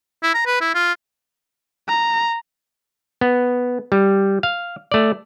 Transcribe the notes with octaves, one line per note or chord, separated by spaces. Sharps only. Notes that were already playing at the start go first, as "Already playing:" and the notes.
E4
A#5
B4
E4
F4
A#5
B3
G3
F5
A3 D5